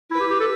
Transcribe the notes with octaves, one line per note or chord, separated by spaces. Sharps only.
E4 B4
G4
G4
A4